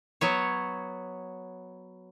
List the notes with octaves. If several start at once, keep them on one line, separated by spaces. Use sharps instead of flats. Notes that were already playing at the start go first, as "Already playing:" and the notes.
F#3 B3 C#5